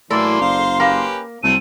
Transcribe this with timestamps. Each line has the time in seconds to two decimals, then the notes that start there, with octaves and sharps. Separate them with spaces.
0.10 A2 E3 F#3 A#3 A4 D5 C6
0.41 F#1 C5 F5 A#5
0.80 A#3 C#4 G4 B4
1.43 C2 F#3 A3 C4 D#7